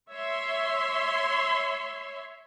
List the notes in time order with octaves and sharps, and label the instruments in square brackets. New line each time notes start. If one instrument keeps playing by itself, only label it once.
[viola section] C#5 E5 C6